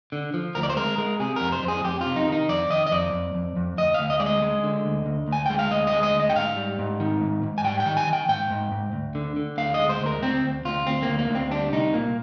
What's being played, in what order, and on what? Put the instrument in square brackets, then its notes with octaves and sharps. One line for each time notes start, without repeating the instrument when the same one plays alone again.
[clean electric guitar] D3
F3
D2 A#4
D5
C5
G#3 A#4
G#3 A#4
C3 G#4
F2 A#4
C5
F2
G#4
F2 G4
C3 F4
D#4
D#3
D#4
F2 D5
D#3 D#5
D#5
F2 D5
F2
F2
F2
D2 D#5
D2 F5
D#5
G#3 D5
D#5
G#3
D3
D2
D2
D2 G#5
G#3 G5
F5
D2 D#5
D#5
G#3
D#5
D2
D#5
G5
G#2 F5
G3
G#2
D#3
G#2
G#2
G#5
G3 G5
G5
D#3
G#5
D#3
G5
G#2 G5
G#2
G#2
D2
D3
D3
D2 F5
G#3 D#5
C5
D2 A#4
D2 C4
D2
D2 F4
D2 C4
A#3
D2
A#3
D2
C4
G3 D4
C2 D#4
A#2 A#3